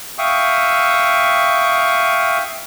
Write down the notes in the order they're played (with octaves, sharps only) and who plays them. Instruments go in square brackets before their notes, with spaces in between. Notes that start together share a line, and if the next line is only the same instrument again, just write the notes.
[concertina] E5 F5 G5 C#6 D#6